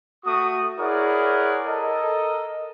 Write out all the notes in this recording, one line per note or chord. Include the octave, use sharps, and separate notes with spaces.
A3 F#4 C#6 D#6
E4 G#4 A#4 C#5 D5 F#5
A4 A#4 D#5